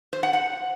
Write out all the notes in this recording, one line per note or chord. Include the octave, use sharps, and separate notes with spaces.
C5
F#5
F#5